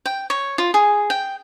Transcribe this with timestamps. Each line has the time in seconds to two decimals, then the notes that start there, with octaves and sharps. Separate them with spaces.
0.06 G5
0.30 C#5
0.58 F4
0.74 G#4
1.10 G5